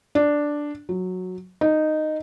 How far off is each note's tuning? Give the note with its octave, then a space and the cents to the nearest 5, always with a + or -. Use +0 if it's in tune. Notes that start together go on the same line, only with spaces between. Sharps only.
D4 +0
F#3 -10
D#4 -10